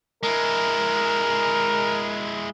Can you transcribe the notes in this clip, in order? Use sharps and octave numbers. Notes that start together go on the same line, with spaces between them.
G#3 E4 A#4